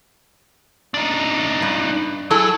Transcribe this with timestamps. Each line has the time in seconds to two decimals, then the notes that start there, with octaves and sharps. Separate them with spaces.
0.94 D4 D#4
1.62 G2
2.31 F#3 E4 G#4 A4